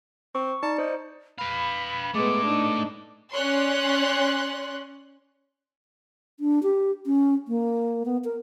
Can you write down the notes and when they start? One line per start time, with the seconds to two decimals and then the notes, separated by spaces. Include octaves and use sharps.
0.35 C4 C#6
0.63 D#4 D5 A5 C#7
0.78 D#4 C5
1.39 B4 F5 B5
2.14 G#3 A3 B3 E4 D6
2.43 D4 D#4
3.32 C#4 C#5 D5 C6 F#6
6.40 D4
6.63 G4
7.06 C#4
7.48 A#3
8.05 B3
8.24 A#4